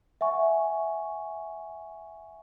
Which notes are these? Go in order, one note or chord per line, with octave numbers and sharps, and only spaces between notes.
E5 F#5 G#5 C#6